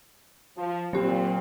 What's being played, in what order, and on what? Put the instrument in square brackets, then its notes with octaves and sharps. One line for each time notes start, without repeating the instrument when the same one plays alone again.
[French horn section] F3
[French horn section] A#2 C4 [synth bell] F#3 G4